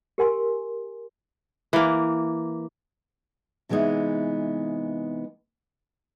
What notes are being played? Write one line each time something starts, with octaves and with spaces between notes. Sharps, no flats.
G4 A#4 G#5 C6
E3 A#3
C3 E3 G#3 B3 D#4